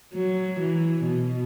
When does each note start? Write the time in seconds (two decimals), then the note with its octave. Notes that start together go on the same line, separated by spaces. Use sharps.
0.14 F#3
0.60 E3
1.06 B2